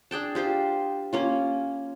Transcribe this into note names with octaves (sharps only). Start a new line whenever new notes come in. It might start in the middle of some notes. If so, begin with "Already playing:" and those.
D4 G#4 G5 A5
F4 G4 C5 C6
A#3 C#4 F4